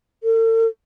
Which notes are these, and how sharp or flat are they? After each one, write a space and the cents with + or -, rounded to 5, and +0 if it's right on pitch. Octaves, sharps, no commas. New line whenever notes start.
A4 +45